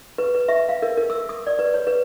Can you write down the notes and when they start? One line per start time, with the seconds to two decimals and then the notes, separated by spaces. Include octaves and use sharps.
0.18 B4
0.35 B4
0.48 E5
0.69 F5
0.82 A#4
0.97 A#4
1.10 E6
1.29 D#6
1.47 D5
1.59 B4
1.74 C#5
1.87 B4